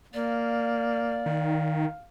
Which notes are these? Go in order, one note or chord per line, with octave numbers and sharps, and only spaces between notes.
A#3 D5 F5
D#3